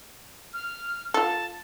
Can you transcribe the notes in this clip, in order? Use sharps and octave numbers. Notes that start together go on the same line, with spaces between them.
F6
F4 A4 A5